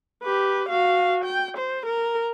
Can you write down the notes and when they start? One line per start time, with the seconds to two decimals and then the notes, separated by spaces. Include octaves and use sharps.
0.23 G4 B4
0.69 F#4 F5
1.24 G5
1.57 C5
1.86 A#4